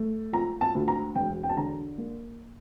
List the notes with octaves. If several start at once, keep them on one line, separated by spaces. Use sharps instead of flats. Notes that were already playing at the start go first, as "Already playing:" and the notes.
Already playing: A3
F3 A#5
A5
D2
A#5
E1 G5
G5
A5
D3 A#5
A#3